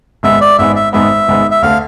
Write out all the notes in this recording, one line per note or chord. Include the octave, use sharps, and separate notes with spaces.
G#1 G#2 G#3 B3 E5
D5
G#1 G#2 G#3 B3 E5
E5
G#1 G#2 G#3 B3 E5
G#1 G#2 G#3 B3
E5
D2 D3 A3 F5